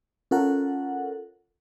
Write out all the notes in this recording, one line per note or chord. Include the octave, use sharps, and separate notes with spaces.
C#4 F4 A4 A#4 F#5